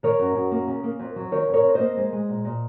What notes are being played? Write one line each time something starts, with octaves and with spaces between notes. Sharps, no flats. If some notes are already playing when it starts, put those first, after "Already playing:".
D#3 A#4 C#5
F#2
F#2
A#3
C#3
A#3
F2
F#3
D#3 A#4 C#5
F2 A#4 C#5
F2
A#3 C5 D#5
G#3
G#3
A#2
A#2